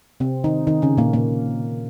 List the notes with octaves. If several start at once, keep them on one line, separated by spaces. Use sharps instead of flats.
C3 C4
D#3 D#4
D#3 D#4
C#3 C#4
A#2 A#3
A#2 A#3